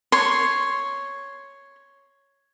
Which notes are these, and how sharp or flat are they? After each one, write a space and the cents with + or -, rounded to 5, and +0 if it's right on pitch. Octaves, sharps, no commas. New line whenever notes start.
C#5 +0 C6 +0